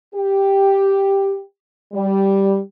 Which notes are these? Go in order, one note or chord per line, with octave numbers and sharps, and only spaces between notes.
G4
G3